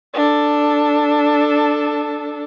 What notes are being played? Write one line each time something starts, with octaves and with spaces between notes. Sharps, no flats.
D4 A4